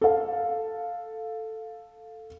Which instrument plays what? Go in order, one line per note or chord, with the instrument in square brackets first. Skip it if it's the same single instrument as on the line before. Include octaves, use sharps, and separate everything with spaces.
[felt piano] A4 F5